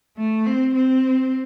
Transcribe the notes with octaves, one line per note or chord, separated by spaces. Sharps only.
A3
C4
C4